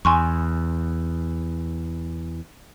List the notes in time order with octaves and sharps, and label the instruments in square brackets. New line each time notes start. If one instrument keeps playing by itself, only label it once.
[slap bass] E2 [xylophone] G#5 C6 C#6